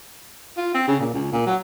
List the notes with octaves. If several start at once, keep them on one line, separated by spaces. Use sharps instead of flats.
F4
C4
C#3
A#2
C#2
A#2
F#3